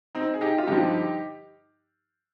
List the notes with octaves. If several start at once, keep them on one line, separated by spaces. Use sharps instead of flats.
C4 D#4
G#4
D#4 G4
F4
G2 D3 F3 D#4 G4